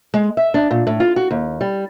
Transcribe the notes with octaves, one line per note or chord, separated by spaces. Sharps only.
G#3
E5
D4
A#2
A2
F4
F#4
D#2
G3